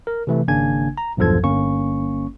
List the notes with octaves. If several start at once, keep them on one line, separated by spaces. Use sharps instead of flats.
A#4
C3 E3 A3
G#1 C#3 A#3 D4 G#5 G#6
A#5
B1 E2 G2 F3 A4 G#6
G1 A#3 C#4 C#6